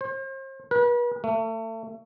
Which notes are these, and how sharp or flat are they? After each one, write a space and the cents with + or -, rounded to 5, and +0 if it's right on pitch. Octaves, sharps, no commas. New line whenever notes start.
C5 +40
B4 -40
A3 +30